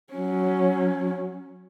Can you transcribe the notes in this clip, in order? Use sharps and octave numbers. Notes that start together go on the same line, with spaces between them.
F#3 C#4